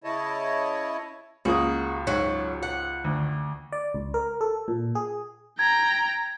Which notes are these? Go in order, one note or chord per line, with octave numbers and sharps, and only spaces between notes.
C#3 E4 C#5 D#5 A5
C#2 G#3 A#3 F#4 D#6
G#2 F#3
F#5
D2
D5
C#2
A#4
A4
A#2
G#4
G5 A#5 G#6